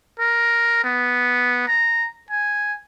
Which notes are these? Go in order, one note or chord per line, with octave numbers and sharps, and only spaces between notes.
A#4
B3
A#5
G#5